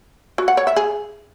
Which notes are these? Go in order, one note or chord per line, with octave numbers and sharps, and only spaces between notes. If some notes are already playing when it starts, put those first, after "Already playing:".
F#4
F#5
C#5
E5
G#4